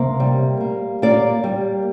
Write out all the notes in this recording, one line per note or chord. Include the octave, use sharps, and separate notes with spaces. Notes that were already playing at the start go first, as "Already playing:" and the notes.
Already playing: C3 A#3
G3
A#3
A#3 D5
G3